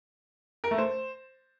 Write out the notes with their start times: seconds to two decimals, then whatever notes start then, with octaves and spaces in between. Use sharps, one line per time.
0.64 A#4
0.71 A3
0.78 C5